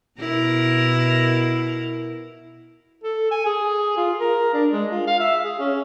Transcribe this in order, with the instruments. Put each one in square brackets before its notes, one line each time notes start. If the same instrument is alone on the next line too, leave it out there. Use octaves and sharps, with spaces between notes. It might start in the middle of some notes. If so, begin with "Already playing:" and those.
[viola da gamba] B2 E4 A#4
[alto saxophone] A4
G#5
G#4
F4
A#4
D4
G#3
F4
F5
E5
G#4
C#4